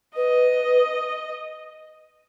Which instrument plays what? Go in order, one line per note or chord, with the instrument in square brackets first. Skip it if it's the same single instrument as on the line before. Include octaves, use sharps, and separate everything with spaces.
[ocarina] B4 [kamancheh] D#5